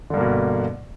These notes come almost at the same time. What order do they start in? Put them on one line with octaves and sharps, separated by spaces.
D3 G2 A#3 B2